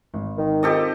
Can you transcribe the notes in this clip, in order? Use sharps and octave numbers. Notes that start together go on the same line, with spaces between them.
G#1
D#3
C4 D#4 F4 G4 A4 D#5